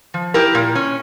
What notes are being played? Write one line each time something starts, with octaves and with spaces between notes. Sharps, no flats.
F3
E4 G4 A#4
A#2
C#4